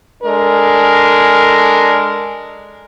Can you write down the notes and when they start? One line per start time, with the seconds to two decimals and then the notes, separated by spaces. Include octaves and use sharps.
0.23 G#3 D4 A4 A#4